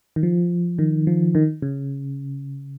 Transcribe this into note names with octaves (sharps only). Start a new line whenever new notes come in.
D#3
F3
D#3
F3
D#3
C#3